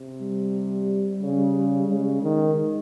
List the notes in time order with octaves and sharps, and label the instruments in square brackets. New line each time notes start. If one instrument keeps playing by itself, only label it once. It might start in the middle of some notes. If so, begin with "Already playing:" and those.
Already playing: [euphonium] C3
[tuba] G3
[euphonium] C#3
[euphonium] C#3 [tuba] G#3
[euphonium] D#3